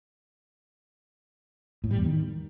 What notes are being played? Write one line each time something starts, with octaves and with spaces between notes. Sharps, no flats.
A2
G3
E2
D#3